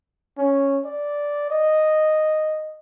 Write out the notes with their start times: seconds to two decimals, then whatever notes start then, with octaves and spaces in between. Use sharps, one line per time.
0.38 C#4
0.85 D5
1.51 D#5